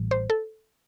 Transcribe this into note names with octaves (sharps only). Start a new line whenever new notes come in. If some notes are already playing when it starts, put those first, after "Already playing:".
Already playing: A1 A2 E3 G3
C5
A4